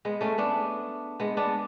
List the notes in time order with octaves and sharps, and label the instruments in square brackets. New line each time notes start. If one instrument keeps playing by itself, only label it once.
[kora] G#3 B3
A3 C#4
B3 D4
G#3 B3
B3 D4